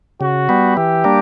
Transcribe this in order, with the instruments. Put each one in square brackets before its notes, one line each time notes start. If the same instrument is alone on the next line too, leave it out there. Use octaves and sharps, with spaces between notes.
[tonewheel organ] C#3 [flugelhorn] F#4
[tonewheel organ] G3 B3
[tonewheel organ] E3 [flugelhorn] G4
[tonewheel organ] G3 A#3 D4